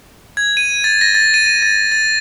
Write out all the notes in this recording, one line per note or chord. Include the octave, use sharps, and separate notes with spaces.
G#6
D#7
A6
A#6
A6
D#7
D#7
A6
A6